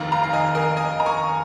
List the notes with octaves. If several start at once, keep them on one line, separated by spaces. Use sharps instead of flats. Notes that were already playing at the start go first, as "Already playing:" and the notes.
Already playing: F1 D#2 D#3 F5 A#5
F5 A#5
F5
D#5 G#5
A#4 D#5
D#5 G#5
A#5
G#5 C#6